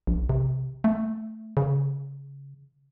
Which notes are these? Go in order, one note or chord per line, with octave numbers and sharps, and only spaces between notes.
A#1
C3
A3
C#3